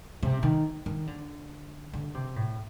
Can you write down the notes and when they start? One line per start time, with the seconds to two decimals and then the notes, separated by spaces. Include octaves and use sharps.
0.23 C3
0.43 D#3
0.86 D#3
1.07 D3
1.93 D3
2.14 C3
2.36 A2